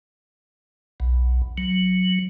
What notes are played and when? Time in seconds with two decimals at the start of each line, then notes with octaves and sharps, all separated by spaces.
1.00 B1
1.58 F#3